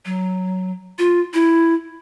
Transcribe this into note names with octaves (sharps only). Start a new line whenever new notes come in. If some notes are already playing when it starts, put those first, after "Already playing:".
F#3
F4
E4